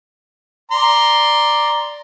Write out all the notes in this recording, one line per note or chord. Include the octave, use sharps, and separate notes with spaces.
D5 A#5 C6